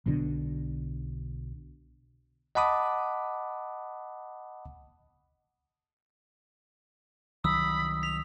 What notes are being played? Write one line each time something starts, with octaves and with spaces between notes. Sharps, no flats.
B1 B2 D3
D#5 F#5 A5 B5 D6 D#6
C2 D#3 F#3 B5 D#6 E6
B6 F7